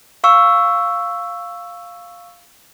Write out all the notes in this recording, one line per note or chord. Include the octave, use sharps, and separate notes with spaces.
F5 C#6 E6